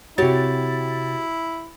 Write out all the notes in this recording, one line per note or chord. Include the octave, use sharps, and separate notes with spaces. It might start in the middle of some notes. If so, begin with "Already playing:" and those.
C3 E4 F#4 G4 C#5 A6